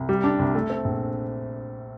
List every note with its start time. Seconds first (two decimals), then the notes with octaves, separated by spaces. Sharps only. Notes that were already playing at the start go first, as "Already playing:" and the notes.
Already playing: C2
0.09 G3
0.24 D4
0.39 C2
0.55 A3
0.70 C4
0.85 A#1